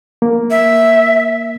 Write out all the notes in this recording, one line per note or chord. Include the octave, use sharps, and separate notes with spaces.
A#3
E5